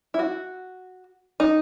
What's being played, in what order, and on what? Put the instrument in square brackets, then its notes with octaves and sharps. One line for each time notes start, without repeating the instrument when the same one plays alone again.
[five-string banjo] E4
F#4
D#4